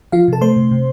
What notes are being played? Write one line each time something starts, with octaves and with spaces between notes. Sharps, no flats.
F3 F4 F5
C3 A4 A5
A3 C5 C6
C3
C3